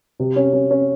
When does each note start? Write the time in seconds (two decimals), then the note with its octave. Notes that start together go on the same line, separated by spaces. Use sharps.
0.19 C3
0.36 C#4
0.53 C#4
0.71 C#4